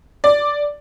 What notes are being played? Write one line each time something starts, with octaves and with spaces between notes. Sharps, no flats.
D5